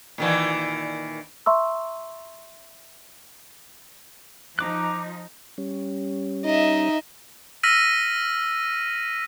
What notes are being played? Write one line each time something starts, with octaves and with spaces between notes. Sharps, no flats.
A#2 D#3 E3
E5 A#5 C6 C#6 E6
F3 D#4 A#5 D6 F#6
G3 C#4
D#4 D#5 E5
E6 F6 A#6 B6 D#7